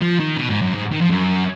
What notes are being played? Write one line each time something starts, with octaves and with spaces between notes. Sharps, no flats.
F3
D#3
B2
G#2
F#2
G#2
D#3
F3
F#2